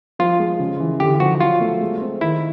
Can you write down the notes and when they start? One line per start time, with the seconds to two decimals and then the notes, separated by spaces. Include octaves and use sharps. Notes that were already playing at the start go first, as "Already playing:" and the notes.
0.19 F3 F4
0.40 G#3
0.59 C#3
0.80 E3
1.00 D3 G4
1.20 F3 F#4
1.40 F#3 F4
1.61 A3
1.81 G#3
2.01 C4
2.21 D#3 E4